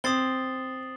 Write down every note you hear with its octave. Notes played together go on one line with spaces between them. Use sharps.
C4 D#6 A6 C7 G7